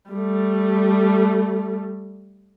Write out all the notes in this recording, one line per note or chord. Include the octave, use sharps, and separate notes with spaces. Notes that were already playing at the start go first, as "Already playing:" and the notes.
G3 A3